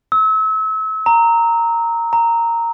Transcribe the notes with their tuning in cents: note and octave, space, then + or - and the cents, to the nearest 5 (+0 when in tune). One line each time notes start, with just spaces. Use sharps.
E6 -35
A#5 -10
A#5 -10